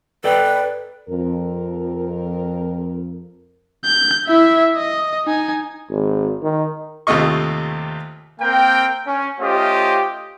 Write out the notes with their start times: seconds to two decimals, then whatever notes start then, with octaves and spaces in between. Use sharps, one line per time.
0.24 A4 B4 D5 G5
1.08 F2 A#4
3.85 G6
4.27 E4 E5
4.76 D#5
5.26 D#4 G#5
5.90 G#1
6.42 D#3
7.07 D#2 C3 A3 F4 D#5 C#6
8.41 A#3 C4 A#4 G5
9.07 C#4
9.40 A3 C#4 F4 G4 C5 D#5